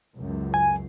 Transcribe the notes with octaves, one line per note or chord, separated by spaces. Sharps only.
C#2 F#2
G#5